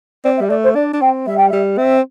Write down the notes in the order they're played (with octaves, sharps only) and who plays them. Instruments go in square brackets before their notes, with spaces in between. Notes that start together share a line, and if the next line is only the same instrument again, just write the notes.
[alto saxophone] C4 [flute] D5
[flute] E5
[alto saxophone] G3
[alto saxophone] A3 [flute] D5
[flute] C5
[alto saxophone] D4 [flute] D5
[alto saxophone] D4
[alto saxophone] C4 [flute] G5
[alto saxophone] G3 [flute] E5
[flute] G5
[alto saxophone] G3 [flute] E5
[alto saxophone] C4 [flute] E5